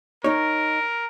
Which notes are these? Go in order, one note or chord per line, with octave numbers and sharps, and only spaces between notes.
D#4 A#4 C#5